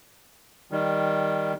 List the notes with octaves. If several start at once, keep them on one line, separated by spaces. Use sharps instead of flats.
D#3 G3